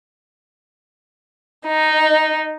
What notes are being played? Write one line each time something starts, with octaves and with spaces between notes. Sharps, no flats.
D#4